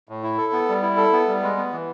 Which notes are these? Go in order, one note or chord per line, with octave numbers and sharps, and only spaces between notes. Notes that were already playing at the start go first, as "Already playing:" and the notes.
A2
E4
A4
B3
G3
E4
A4
B3
G3
G#3
B3
E3